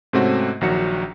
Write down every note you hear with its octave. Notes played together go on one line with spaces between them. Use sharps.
G#2 C3 A3 C4 C#4 F#4
A#1 D#3 F#3 F#4 C#7